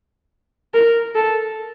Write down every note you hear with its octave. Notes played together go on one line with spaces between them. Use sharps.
A#4
A4